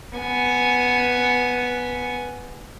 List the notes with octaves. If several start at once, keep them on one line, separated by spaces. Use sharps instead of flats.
B3 G#5